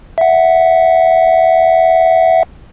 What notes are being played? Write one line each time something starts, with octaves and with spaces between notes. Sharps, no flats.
E5 F#5